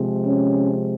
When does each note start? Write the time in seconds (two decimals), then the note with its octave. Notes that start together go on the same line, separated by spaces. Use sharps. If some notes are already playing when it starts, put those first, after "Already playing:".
Already playing: C3 F3 G#3
0.26 C#4